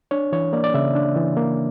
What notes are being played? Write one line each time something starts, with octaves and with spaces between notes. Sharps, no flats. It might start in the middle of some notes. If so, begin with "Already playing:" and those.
D4 C#5
E3 C#5
A#3 D5
D5
C#3 E5
D4
E3
A#3